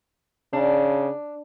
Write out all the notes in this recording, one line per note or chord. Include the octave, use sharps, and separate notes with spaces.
C#3 D4